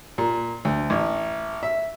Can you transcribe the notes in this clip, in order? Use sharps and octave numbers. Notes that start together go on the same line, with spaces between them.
A#2
D2
A1
E5